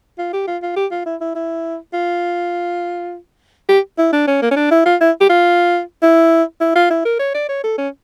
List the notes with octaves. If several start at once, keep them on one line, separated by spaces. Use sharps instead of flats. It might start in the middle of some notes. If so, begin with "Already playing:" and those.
F4
G4
F4
F4
G4
F4
E4
E4
E4
F4
G4
E4
D4
C#4
A#3
C#4
D4
E4
F4
E4
G4
F4
E4
E4
F4
E4
A#4
C#5
D5
C#5
A4
C#4